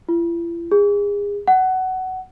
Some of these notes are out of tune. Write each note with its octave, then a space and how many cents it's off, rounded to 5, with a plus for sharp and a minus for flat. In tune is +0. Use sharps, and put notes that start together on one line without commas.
E4 +45
G#4 -30
F#5 +15